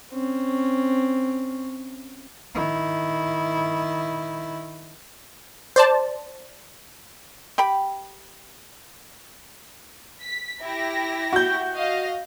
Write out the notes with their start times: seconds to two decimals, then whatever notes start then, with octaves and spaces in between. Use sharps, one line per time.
0.12 C4 C#4
2.54 D#3 E4
5.76 C5 D5 A5
7.58 G4 G5 B5
10.23 B6
10.61 E4 G4 A#6
11.32 F#4 G6
11.76 D#5 F5